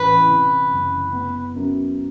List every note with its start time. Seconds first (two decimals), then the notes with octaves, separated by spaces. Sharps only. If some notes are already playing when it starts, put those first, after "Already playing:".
Already playing: A1 E3 B4
0.27 C3
0.70 F#1
1.12 B3
1.55 F#2